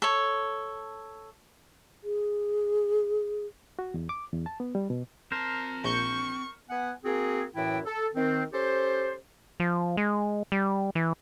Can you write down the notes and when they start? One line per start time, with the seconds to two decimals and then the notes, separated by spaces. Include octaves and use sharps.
0.02 A4 C#5
2.04 G#4
3.79 F#4
3.94 E2
4.09 D6
4.33 E2
4.46 A5
4.60 B3
4.75 G3
4.90 B2
5.32 C4 A#4 C5 A5
5.84 A#1 C#6 G6 C#7
6.70 B3 F#5 G#5
7.05 A#3 C4 F#4 G#4
7.56 F#2 A2 E3 E4 E5 G5
7.86 A4
8.15 D#3 C4
8.53 C#4 G4 A4 C5
9.60 F3
9.97 G#3
10.52 G3
10.95 E3